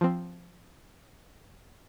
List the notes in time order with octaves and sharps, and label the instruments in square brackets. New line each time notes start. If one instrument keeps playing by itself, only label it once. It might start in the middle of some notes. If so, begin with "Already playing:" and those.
[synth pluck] F3 C4